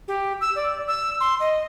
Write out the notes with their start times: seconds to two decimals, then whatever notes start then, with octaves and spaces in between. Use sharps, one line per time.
0.08 G4
0.41 E6
0.55 D5
0.88 E6
1.20 C6
1.40 D#5